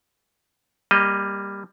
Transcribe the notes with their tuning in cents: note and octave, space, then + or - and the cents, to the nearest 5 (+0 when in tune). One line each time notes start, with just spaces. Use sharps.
G3 +15 A#3 +10 D#5 +0